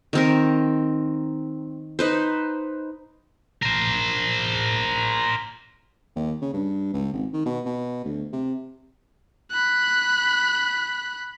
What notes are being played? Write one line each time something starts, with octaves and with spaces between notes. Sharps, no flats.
D#3 C4 A#4
D#4 B4 C5
A#4 C5
D#2
C#3
G2
C#2
G#1
D#3
B2
B2
D2
C3
B5 F#6